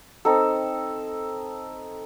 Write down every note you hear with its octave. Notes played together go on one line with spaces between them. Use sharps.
C4 D#4 A4